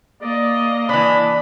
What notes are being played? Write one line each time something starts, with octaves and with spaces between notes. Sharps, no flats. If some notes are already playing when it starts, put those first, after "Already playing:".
A#3 D5 D#5
E3 D4 G#5 B5